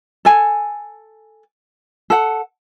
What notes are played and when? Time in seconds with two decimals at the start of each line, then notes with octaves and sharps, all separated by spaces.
0.25 A4 G#5
2.10 A4 F#5